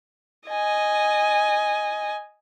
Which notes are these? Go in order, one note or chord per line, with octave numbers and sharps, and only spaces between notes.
D#5 G#5